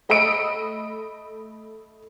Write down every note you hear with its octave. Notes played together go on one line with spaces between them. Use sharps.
A3 D#5 B5 E6 D7